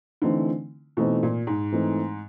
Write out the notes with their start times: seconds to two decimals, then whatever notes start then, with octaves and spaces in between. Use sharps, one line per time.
0.22 D3 E3 A3 C4 D#4
0.97 B2 E3 A3 C4 D#4
1.23 A#2
1.47 G#2
1.72 E3 A3 C4 D#4